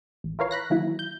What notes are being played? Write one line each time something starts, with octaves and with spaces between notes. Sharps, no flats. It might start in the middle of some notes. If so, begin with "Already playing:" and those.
A1
E4 F4 A#4 B4 C#5 F5
B5 F#6 A#6
D#3 E3 F#3 A#3 E4
G6